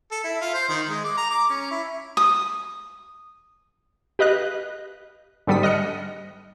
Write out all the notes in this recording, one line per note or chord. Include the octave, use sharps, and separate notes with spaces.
A4
E4
F4
C5
D#3
G#3
D6
A#5
D6
C#4
E4
D#6
G4 B4 D#5 F5 F#6
G#2 D3 G3 A4 D#6 B6
D#5 F6 F#6 C#7